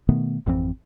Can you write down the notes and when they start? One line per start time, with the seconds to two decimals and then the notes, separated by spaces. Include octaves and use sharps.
0.09 B2 D#3 A3 B3
0.46 G#1 F2 E3 C4